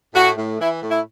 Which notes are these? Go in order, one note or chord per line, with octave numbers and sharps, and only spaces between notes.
A2 F#4
A2
E3 E4
A2
E4